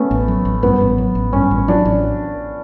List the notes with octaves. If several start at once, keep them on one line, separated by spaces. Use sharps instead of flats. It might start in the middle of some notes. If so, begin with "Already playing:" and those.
Already playing: A3 B3 C#4
A1
F#3
A1
G2 B3
A1
F#3
A1
G2 C#4
A1
F#3 D4
A1